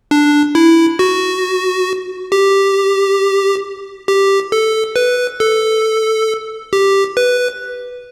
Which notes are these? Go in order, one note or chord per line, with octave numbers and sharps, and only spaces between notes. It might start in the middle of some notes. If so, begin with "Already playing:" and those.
D4
E4
F#4
G4
G4
A4
B4
A4
G4
B4